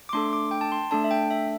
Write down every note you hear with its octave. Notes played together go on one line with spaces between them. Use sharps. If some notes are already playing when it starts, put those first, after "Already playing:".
D6
A3 D4 A4 C6
D6
G5
A5
C6
A3 D4 A4 A5
E5
G5
E5